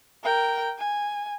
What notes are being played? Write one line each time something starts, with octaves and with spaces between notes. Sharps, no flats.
A#4 G5
G#5